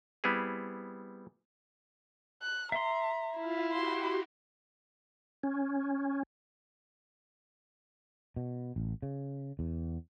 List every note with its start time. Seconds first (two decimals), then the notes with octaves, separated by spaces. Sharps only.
0.24 G3 B3 C4 E4 G#4
2.42 F#6
2.72 E5 A#5 C6
3.39 E4 F4 F5
3.72 F#4 G4 C6
5.43 C#4
8.36 B2
8.76 A1
9.02 C#3
9.59 E2